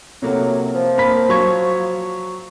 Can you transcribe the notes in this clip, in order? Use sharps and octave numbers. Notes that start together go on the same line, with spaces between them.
A2 C3 F#3 A#3
F3
A#3 B5 B6
F#3 C#6 G#6